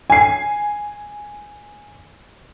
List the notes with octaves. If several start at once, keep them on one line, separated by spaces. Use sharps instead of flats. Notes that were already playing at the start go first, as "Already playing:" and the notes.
G#5 C7